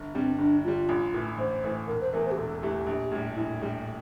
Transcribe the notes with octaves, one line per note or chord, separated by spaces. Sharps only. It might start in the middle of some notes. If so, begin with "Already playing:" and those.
Already playing: G1
G2 D3 G3 C4
G1 D4
G2 D3 G3 F4
A1
A2 E3 A3
A1 C5
A2 E3 A3
E1 A#4
C5
E2 E3 A3 A#4
C5
G4
E1 A4
E2 E3 A3 G4
A#1
A2 G3
A#1 E4
A2 G3